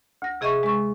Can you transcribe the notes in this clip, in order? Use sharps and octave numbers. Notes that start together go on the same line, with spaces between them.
D2 A#6
C3 G#4 D#5 E5 C#6
G#3 C#6